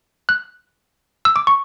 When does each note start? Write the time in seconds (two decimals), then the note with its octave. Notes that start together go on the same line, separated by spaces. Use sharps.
0.29 F#6
1.25 E6
1.36 D6
1.47 C#6